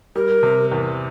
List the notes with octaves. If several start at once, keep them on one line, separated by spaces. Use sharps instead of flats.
G3 A#4
C3
E2